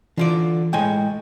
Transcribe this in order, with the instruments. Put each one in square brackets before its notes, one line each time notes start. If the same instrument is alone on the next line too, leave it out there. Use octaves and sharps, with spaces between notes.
[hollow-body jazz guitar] D3 F4 D5 [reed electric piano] E3
[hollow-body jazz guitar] A2 G#3 G#5 [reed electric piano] G5